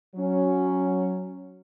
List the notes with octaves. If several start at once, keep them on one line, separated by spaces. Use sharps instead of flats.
F#3 C#4